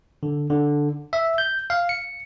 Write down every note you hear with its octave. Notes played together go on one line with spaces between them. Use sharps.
D3
D3
E5
G6
F5
C#7